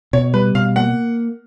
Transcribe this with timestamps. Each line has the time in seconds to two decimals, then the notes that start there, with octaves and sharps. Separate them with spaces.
0.13 B2 C#5
0.34 G3 B4
0.55 B2 F5
0.76 A#3 F#5